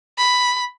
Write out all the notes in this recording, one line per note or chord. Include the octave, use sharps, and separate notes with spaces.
B5